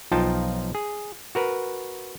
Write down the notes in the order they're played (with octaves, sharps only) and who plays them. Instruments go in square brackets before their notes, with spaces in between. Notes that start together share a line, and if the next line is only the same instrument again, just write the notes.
[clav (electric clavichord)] B1 F3 D#4 F4 G5 A5
G#4
F#4 A#4 B4